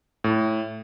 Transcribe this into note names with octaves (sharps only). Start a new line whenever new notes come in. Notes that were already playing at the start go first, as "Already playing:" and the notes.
A2